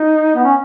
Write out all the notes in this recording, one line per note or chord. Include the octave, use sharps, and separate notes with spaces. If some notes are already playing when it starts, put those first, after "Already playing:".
Already playing: D#4
B3
C#4